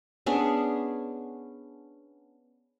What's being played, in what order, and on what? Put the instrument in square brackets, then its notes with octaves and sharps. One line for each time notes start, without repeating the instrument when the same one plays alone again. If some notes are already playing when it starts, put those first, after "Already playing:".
[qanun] B3 C#4 D4 G#4